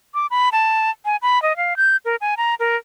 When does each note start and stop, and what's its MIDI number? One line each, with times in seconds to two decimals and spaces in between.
0.14 0.27 86
0.31 0.49 83
0.52 0.90 81
1.05 1.16 80
1.22 1.42 83
1.42 1.56 75
1.57 1.77 77
1.77 1.96 91
2.05 2.16 70
2.21 2.35 80
2.37 2.55 82
2.60 2.76 70